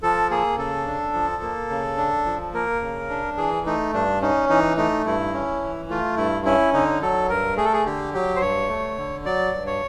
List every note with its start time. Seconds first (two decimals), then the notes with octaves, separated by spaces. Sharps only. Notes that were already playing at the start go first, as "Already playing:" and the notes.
0.02 F3 A4
0.30 A#3 G#4
0.57 C#3 A4
0.86 D4
1.13 F3
1.42 A#3
1.69 C#3
1.97 D4
2.26 F3
2.54 A#3 A#4
2.81 C#3
3.10 D4
3.37 E3 G#4
3.66 A3 D#4
3.93 G2 D4
4.21 C#4 D#4
4.49 E3 D#4
4.77 A3 D#4
5.05 G2 E4
5.34 C#4
5.62 E3
5.90 A3 F4
6.17 G2 E4
6.45 C#4 E4
6.74 D3 D#4
7.02 F#3 A4
7.29 G2 A#4
7.57 A3 G#4
7.65 A4
7.73 G#4
7.85 D3 G4
8.14 F#3 G4
8.36 C5
8.41 G2 C#5
8.69 A3
8.97 D3
9.25 F#3 D5
9.53 G2
9.66 C#5